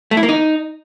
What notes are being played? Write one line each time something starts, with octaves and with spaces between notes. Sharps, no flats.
A3
E4
A#3
D#4